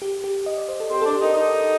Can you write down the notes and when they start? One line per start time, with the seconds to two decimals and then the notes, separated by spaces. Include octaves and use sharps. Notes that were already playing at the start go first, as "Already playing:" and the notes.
0.02 G4
0.24 G4
0.46 D#5
0.57 D5
0.69 C5
0.80 A4
0.91 C4 G4
1.02 D4 A4
1.13 G4
1.21 D#4 A#4
1.35 D#4